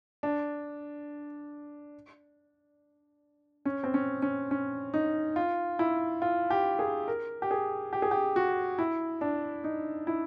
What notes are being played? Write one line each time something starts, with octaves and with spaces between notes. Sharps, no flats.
D4
C#4
C4
C#4
C#4
C#4
D#4
F4
E4
F4
G4
G#4
A#4
G4
G#4
G4
G#4
G4
F#4
E4
D4
D#4
E4